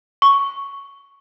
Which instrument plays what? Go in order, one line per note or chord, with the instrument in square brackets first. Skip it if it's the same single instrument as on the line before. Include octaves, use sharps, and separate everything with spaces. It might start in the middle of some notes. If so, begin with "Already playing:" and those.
[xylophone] C#6